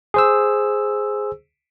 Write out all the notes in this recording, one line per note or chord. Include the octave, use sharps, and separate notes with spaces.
G#4 C5 E6